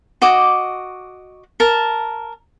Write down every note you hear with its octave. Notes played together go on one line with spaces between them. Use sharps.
F#4 D#5 D6
A#4 A5